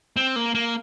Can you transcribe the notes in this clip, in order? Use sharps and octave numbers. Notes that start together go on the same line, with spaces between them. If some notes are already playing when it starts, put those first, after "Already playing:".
C4
A#3
A#3